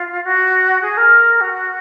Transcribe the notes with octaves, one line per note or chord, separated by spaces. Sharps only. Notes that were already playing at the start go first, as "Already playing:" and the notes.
Already playing: F4
F#4
G#4
A#4
F#4